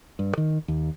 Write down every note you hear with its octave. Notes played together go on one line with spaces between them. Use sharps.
G2
D#3
D#2